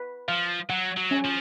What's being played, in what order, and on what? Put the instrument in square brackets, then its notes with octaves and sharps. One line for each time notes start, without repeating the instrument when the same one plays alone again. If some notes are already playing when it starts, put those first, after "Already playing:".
Already playing: [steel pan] B4
[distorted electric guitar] F3 [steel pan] F5
[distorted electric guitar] F#3 [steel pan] F#5
[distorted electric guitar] F#3
[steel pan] C#4
[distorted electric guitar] F3